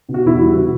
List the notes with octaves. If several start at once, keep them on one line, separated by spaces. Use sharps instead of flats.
B2
F#4
E2 E4
F#4
G3
B2 F#4